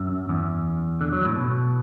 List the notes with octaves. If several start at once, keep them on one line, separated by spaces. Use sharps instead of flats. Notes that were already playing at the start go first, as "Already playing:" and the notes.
Already playing: F#2
E2
D3
F#3
A2
B2